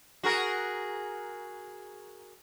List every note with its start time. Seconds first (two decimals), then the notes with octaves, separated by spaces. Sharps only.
0.23 F#4 G#4 A#4